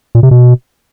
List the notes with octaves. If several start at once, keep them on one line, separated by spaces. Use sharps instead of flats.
A#2
C3
B2